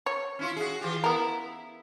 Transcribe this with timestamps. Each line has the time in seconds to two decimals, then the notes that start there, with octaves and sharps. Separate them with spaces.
0.06 C#5
0.39 C#4 E4 F4
0.56 F#4 G#4
0.81 E3 F4 G4
1.04 B3 E4 A#4